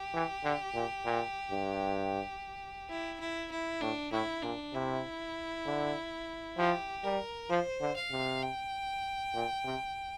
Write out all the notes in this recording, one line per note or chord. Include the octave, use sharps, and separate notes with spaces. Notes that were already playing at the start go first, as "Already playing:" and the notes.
Already playing: G4
E3
D3
A#2
A#2
G2
E4
E4
E4
A2 D4
A2 E4
A#2 D4
C3 E4
D3
F3 G4
G3 A#4
F3 C5
D3
F5
C3
G5
A#2
C3